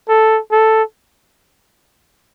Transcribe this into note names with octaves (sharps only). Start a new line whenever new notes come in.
A4
A4